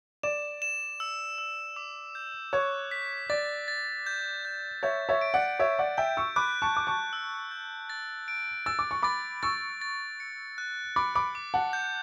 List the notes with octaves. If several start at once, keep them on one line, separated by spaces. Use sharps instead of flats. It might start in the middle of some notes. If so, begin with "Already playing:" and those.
D5 E7
E7
E6
E6
D6
G6
C#5 F#6
B6
D5 A6
A6
G6
G6
C#5 E5 G6
C#5 E5
D7
D5 F#5
C#5 E5 G6
D5 F#5
E5 G5 G6
C#6 E6
B5 D6 F#6
A5 C#6
D6 F#6
A5 C#6
E6
G6
A6
D7
E6 A6
D6
C#6
B5 D6 A6
C#6 E6 A6
A6
C#7
F#6
B5 D6 A6
B5 D6
D6
F#5 A5
G6